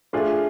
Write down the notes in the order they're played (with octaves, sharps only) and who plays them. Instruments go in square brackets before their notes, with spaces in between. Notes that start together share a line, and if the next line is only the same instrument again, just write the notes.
[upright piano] A3 D4 F4 G#4